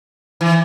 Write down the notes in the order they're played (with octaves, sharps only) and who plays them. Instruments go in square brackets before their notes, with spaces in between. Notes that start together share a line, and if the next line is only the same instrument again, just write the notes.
[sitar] E3